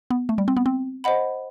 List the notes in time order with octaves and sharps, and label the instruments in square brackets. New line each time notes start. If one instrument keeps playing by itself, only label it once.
[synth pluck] B3
A3
G3
C4
B3
C4
[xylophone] C5 D#5 F#5 B5